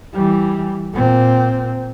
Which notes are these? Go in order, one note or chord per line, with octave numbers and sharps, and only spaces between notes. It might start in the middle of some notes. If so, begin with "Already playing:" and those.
E3 G3
A#2 C4